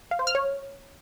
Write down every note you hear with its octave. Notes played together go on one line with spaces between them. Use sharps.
F5
C5
F6
C#5